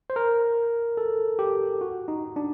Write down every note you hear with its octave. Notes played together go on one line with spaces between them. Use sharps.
C5
A#4
A4
G4
F#4
D#4
D4